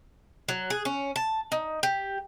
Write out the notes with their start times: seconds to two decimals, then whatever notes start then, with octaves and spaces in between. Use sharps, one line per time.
0.48 F#3
0.70 G#4
0.85 C#4
1.16 A5
1.52 D#4
1.83 G4